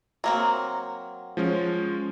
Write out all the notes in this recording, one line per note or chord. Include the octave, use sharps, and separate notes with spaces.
F#3 A#3 C4
F3 G#3 C#4